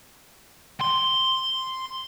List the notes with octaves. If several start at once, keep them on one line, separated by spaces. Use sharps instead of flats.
C6